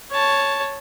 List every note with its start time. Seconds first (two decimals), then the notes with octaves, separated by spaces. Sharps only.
0.11 C#5 A5